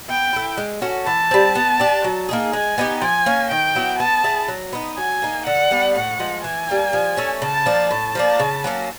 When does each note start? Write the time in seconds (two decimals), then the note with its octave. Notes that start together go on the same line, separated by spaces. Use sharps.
0.09 B3 G5
0.33 E4 A4
0.57 G#3
0.82 C#4 F#4 A4
1.06 E3 A5
1.31 G3 C4
1.55 B3
1.80 D4 G4
2.04 F#3
2.29 A#3 D#4 G#4
2.53 G#3 G#5
2.78 B3 D#4 G4
3.01 F3 G#5
3.26 A#3 C#4
3.51 D#3 G5
3.75 F#3 B3 E4
4.00 B3 A5
4.24 E4 G#4
4.48 F#3
4.73 B3 D#4
4.97 F#3 G#5
5.22 A#3 D#4
5.46 D3 F#5
5.71 G3 B3 D4
5.95 A2 F#5
6.20 F3 G#3
6.44 E3 G#5
6.69 G3 A#3
6.93 F3
7.17 A3 C#4
7.42 C#3 A5
7.66 F3 A#3 D4
7.90 A2 A5
8.15 F3 A#3 D4
8.39 C#3
8.64 F#3 A#3 C#4